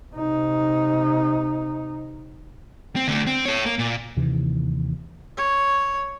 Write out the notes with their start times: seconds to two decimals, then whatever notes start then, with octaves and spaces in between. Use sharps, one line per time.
0.14 C3 D#4
2.96 C4
3.08 D3 A3
3.27 C4
3.45 A4 C#5
3.66 A#3
3.79 A#2
4.17 D#2 C3 E3
5.37 C#5